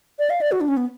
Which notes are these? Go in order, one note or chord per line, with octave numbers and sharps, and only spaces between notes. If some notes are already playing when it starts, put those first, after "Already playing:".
D5
F5
D5
F#4
D4
C#4
B3